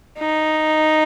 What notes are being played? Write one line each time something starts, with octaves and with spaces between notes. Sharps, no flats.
D#4